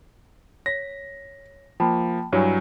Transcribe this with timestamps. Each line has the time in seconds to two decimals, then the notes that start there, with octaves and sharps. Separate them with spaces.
0.66 C#5 A#6 B6
1.80 F3 A#3 G5 A5 B5
2.33 G2 F#3 E4 C#5 G#5